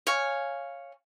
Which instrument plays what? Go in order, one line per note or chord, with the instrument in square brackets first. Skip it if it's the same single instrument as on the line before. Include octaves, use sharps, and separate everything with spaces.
[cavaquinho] C#5 F5 G#5